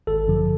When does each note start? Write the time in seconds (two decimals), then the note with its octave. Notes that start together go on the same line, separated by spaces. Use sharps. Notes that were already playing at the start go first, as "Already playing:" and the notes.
0.07 G#1 A4
0.28 F#2 D3 F3